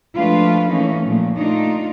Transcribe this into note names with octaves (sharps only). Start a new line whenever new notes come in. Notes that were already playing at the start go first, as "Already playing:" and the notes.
F3 G#3 A3 D4 F4 B4
E3 A3 A#3 C#4 D#4
A#2 F3 A3
A3 D4 D#4 F4